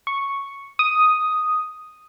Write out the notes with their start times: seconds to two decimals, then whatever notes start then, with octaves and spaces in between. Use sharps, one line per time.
0.07 C#6
0.79 D#6